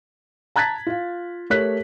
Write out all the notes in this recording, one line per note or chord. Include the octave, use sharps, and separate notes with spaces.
A5 A#5 F#6 G#6 A6 B6
F4 F5
A3 G4 A#4 C#5 F#6 B6